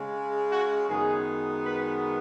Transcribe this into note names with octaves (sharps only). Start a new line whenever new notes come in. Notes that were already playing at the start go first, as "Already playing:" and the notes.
Already playing: C#3 G#3 C#4
F#4
F#2 D#3 G#3 B3 G#4
B4